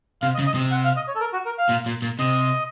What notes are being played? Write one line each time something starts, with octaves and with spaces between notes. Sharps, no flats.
C3 F5
D#5
C#3
D#5
C3
F#5
F5
D#5
C#5
A4
A#4
F#4
A#4
F5
A#2
A#2
A#2
C3 D#5